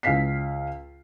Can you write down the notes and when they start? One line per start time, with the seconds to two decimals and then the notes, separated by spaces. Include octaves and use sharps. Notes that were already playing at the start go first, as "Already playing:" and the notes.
0.03 C#2 F5 B6 C7